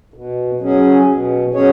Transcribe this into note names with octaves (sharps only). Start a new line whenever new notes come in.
B2
F#3 C#4 G#4
B2
F#3 C#4 G#4 C#5